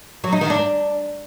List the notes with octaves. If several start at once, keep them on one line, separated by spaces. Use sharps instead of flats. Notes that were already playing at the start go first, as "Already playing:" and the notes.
F#3
D#4
D#3
D4